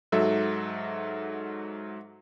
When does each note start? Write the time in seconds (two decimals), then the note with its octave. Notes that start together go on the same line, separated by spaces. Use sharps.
0.12 G#2 F#3 A4 E5